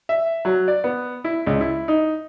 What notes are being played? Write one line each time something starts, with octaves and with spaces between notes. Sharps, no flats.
E5
F#3
D5
B3
E4
C#2
E4
D#4